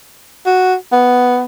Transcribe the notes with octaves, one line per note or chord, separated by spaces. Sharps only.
F#4
B3